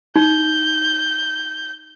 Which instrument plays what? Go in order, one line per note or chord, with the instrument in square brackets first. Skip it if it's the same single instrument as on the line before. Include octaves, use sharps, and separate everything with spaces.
[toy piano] D#4 [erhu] G6